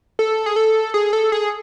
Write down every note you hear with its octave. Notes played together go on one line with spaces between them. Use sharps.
A4
G#4
A4
G#4
A4
G#4